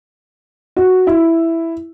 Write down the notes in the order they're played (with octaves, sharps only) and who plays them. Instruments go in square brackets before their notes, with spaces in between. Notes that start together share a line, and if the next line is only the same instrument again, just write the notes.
[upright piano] F#4
E4